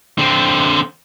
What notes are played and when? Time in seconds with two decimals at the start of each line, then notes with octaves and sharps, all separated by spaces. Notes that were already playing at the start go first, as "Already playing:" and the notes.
0.18 D3 C4